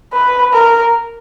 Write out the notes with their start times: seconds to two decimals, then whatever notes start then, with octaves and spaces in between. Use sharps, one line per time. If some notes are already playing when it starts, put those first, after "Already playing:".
0.13 B4
0.53 A#4